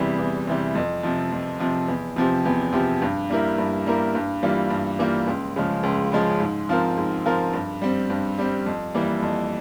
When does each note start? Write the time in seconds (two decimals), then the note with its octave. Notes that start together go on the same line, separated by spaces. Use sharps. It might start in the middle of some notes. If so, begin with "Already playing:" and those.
Already playing: E2 C3 E3 G3
0.19 E2
0.47 C3 E3 G3
0.75 F2
1.03 C3 F3
1.32 F2
1.59 C3 F3
1.88 E2
2.16 C3 F3 C4 G4
2.45 E2
2.72 C3 F3 C4 G4
3.02 G2
3.30 G3 A#3 E4 A#4
3.58 G2
3.86 G3 A#3 E4 A#4
4.15 G2
4.43 E3 G3 A#3 F4
4.70 G2
4.99 E3 G3 A#3 F4
5.27 C#2
5.56 C#3 F3 G#3
5.83 C#2
6.12 C#3 F3 G#3
6.40 G#2
6.69 F3 C4 F4 A#4
6.97 G#2
7.26 F3 C4 F4 A#4
7.53 G2
7.82 G3 C4
8.10 G2
8.38 G3 C4
8.66 F2
8.95 E3 G3 A#3
9.22 F2